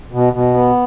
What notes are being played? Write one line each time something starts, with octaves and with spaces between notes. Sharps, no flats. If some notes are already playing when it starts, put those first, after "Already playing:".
B2
B2
B3